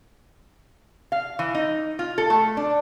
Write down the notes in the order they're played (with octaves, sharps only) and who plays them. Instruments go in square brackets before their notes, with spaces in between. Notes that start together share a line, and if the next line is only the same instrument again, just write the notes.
[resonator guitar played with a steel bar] F5
E3
D#4
F4
A4
A3
D4